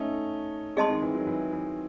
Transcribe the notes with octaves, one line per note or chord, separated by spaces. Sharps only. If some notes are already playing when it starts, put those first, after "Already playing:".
Already playing: A3 C#4 D#4
G#3 C4 G#4 D#5 A5 C6
D#3
E3
D#3 F#3
E3
E3